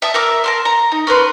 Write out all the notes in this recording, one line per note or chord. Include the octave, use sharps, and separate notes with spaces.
E5 A5 D#6
A#4 E5 D6
A#4 A5 C6
A#5
D#4
C#4 A#4 B4 C6